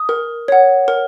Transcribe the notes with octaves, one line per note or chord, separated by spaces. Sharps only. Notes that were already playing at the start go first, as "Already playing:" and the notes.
Already playing: D#6
A#4
C#5 F#5
A#4